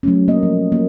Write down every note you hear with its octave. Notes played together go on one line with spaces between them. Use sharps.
F#3 A3 C#4
A#3 D#5
F3
A#3